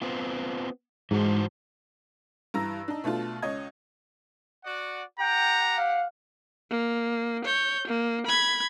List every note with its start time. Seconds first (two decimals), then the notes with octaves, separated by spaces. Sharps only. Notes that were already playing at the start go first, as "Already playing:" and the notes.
0.02 B3 C4 F4
1.11 G#2 E3 F#4 C5
2.54 G2 E3 A#5 E6 A#6
2.88 D4 D#4
3.04 B2 A3 D4 F4
3.42 C#2 C#5 D#5 G#6
4.65 F#4 D5 F#5
5.19 G4 F#5 G5 A#5
5.78 F5
6.70 A#3
7.45 C#5 G6
7.87 A#3
8.26 B5 G#6